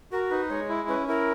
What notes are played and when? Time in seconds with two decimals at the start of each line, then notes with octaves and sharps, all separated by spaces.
0.12 F#4 A#4
0.31 D#4 B4
0.50 G#3 C#5
0.69 E4
0.88 C#4 B4
1.07 E4 A#4